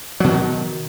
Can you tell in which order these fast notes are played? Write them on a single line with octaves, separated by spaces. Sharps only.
F#3 B2 E3 D#3